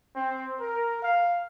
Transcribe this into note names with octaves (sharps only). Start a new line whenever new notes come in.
C4
A#4
F5